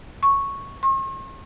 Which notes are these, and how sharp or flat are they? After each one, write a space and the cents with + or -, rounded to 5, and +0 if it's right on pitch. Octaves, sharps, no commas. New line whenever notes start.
C#6 -5
C#6 -45